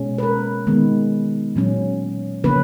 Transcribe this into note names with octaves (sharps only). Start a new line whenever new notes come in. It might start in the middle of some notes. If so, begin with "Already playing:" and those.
Already playing: B2 G#3 C#4
B4
A#4
D#3 G#3 B3
A#2 F#3 C#4
C#3 F3 A#3 C#4 B4